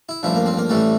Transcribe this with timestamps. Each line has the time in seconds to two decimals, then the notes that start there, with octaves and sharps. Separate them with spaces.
0.09 E4
0.23 A1 G2 F3 E4
0.35 A#3
0.46 C4
0.57 A#3
0.69 A1 A2 E3 G3 A3